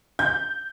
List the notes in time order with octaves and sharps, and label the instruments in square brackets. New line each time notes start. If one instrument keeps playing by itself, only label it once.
[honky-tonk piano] G6